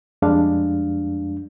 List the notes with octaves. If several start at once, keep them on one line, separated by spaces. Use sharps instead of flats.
F2 G3 G#3 D4 F5